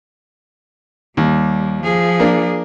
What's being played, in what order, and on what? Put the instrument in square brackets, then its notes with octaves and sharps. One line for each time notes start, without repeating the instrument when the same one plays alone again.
[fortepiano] D#2 [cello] G3
[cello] F3 G#4
[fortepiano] A#3 D4